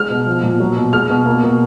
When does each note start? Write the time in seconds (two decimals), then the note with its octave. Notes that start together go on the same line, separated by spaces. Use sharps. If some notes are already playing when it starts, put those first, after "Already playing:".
Already playing: G#3 F6
0.10 B2
0.26 F3
0.43 A#2
0.60 F#3
0.76 B2
0.93 G#3 F6
1.10 B2
1.26 A#3
1.43 B2